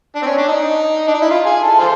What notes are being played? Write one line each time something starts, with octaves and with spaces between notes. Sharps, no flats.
D4
C4
C#4
D4
D#4
D4
D#4
E4
F4
G#4
A4
F4 A4 C5